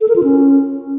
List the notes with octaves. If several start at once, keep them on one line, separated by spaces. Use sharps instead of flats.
A4
A#4
F4
C#4